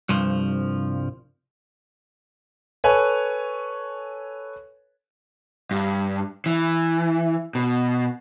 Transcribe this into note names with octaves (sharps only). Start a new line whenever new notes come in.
C2 G2 F3
A4 B4 C#5 G#5
G2
E3
B2